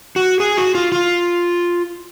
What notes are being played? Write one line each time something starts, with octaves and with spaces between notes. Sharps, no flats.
F#4
G#4
F#4
F4
F4